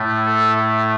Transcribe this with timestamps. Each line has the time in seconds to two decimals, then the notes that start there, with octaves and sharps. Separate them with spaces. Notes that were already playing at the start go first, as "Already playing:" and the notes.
Already playing: A2 A3
0.25 A4